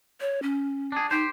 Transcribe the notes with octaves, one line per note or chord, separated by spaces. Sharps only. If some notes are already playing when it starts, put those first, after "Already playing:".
C#5
C#4
D4 G#4
D#4 G4 C5